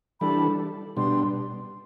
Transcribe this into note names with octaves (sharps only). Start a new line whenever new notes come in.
E3 G3 D4 A4 B5
B2 G3 D4 C6